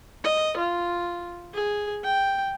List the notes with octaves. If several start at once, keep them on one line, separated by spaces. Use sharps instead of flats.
D#5
F4
G#4
G5